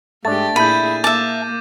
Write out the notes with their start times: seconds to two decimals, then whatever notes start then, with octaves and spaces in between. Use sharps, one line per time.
0.25 G#2 A3 D4 G4 A6
0.56 A#2 E4 G#4 B5 G6 D#7
1.04 A#3 E5 A5 D6